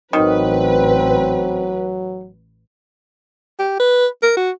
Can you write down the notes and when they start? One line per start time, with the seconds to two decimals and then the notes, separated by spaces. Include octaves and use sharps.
0.13 A1 D#3 F#3 C4 B4
3.59 G4
3.80 B4
4.23 A#4
4.37 F#4